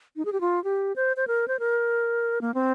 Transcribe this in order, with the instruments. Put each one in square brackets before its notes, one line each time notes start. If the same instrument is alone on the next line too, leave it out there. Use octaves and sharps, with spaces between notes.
[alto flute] D#4
G#4
G4
F4
G4
C5
C5
A#4
C5
A#4
A#3
C4